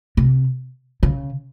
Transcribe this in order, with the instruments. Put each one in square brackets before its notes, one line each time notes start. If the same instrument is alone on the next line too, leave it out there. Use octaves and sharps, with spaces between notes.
[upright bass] C3
C#3